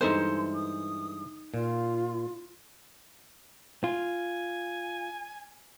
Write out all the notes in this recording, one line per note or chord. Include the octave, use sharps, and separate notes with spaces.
G2 E3 G#3 D#4 A4 C5 C6
D#6
A#2 F4
F4 G#5